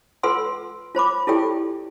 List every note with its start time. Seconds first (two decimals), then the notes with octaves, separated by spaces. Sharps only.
0.23 F4 A4 B4 F#5 C6 E6
0.95 F4 C5 B5 D6
1.27 E4 F4 G4 A4 D5 G5